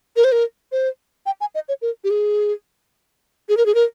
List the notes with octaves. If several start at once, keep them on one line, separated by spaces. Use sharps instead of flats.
A#4
C5
A#4
C5
G5
G#5
D#5
C#5
A#4
G4
G#4
G#4
A#4
G#4
A#4